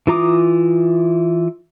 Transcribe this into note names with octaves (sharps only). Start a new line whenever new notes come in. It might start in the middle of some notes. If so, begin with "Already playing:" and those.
E3 F4 A#5 D6 D#6